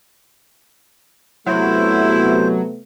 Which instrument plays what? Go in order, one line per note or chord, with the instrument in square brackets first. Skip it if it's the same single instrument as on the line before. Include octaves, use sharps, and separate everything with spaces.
[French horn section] C3 A3 B3 [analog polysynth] F#3 [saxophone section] E4 [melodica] C5